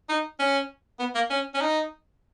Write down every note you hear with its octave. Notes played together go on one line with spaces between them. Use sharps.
D#4
C#4
B3
A#3
C#4
C#4
D#4